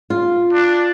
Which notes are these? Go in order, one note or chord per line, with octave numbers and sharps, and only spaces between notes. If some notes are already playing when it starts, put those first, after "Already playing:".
F4
D4